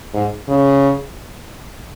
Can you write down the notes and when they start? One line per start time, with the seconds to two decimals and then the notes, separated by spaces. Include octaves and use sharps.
0.14 G#2
0.49 C#3